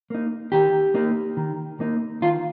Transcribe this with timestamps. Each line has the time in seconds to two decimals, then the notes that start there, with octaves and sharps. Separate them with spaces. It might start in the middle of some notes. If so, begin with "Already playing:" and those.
0.10 A#3 D#4
0.52 D#3 G4
0.94 A#3 D#4
1.37 D#3
1.80 A#3 D#4
2.22 D#3 F4